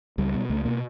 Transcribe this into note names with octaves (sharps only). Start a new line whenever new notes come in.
C#2 G3
B2
C#2 A3
B2 A#3